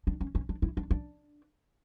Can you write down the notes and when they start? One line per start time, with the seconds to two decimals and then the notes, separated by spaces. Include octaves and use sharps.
0.07 D4
0.21 C#4
0.35 C#4
0.49 D4
0.62 E4
0.77 D4
0.91 D4